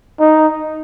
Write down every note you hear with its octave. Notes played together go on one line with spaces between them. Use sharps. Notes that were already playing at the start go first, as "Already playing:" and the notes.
D#4